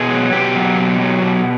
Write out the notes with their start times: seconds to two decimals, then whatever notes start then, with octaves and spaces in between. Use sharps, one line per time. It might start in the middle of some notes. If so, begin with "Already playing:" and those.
Already playing: B2 G#4
0.10 F#3
0.32 B2 G4
0.56 F#3
0.78 B2
1.00 F#3
1.22 B2